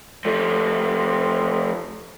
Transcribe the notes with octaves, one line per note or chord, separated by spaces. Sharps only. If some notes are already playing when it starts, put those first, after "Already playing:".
F3 A3